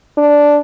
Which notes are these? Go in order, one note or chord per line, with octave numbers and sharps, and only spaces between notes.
D4